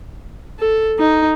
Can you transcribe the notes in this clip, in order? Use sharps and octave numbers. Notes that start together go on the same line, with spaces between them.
A4
D#4